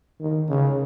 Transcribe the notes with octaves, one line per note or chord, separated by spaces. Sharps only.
D#3
C#3